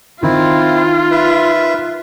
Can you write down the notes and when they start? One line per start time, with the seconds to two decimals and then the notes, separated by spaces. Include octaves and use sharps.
0.23 D#3 C4 E4 F4
1.11 B4 E5